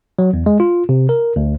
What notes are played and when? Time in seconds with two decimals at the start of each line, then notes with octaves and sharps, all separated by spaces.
0.19 F#3
0.34 E2
0.46 G#3
0.60 F4
0.89 C3
1.09 A#4
1.36 D2